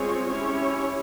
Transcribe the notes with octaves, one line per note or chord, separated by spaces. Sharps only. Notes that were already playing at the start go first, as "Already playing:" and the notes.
Already playing: G#3 C4 F4 G#4 C#5
C#4 E4 G4 C#5